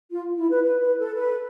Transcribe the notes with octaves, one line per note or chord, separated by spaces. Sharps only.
F4
E4
B4
B4
B4
A4
B4